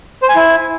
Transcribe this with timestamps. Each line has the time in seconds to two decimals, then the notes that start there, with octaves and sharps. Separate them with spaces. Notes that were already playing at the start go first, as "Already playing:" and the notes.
0.23 C5
0.29 G#5
0.35 E4